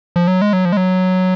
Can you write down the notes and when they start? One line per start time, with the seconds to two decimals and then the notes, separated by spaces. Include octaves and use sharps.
0.16 F3
0.27 F#3
0.42 G#3
0.53 F#3
0.65 F3
0.72 G#3
0.77 F#3